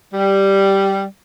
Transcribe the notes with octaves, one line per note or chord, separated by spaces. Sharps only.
G3